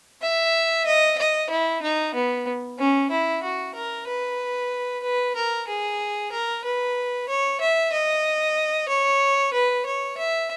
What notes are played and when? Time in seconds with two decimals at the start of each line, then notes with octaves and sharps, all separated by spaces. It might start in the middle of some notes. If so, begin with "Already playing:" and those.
0.22 E5
0.86 D#5
1.18 D#5
1.50 E4
1.82 D#4
2.14 B3
2.79 C#4
3.11 E4
3.43 F#4
3.75 A#4
4.07 B4
5.03 B4
5.36 A#4
5.68 G#4
6.32 A#4
6.64 B4
7.29 C#5
7.60 E5
7.92 D#5
8.89 C#5
9.53 B4
9.86 C#5
10.17 E5